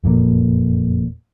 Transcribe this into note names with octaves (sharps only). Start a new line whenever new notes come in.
F#1 F2 A#2